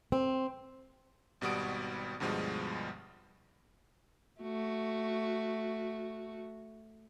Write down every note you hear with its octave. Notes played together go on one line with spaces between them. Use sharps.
C4
G#1 B2 G3 F#4 D#6 D7
D2 G2 B2 F3 G3 G#3
A3 F#4